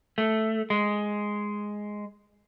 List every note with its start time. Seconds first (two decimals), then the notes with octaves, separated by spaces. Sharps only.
0.18 A3
0.70 G#3